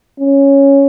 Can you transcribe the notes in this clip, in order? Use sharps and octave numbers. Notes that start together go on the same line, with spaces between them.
C#4